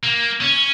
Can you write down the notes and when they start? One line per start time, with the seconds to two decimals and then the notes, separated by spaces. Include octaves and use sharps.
0.03 A#3
0.41 C#4